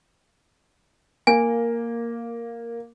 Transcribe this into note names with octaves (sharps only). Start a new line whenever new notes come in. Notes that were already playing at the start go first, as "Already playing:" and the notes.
A#3 G#5